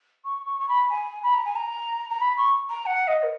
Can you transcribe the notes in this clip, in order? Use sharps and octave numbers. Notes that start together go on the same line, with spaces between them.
C#6
C#6
C#6
B5
G#5
B5
A#5
G#5
A#5
A#5
B5
C#6
A#5
F#5
D#5
A#4